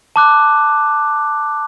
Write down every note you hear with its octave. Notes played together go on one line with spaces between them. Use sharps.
A5 D6 F#6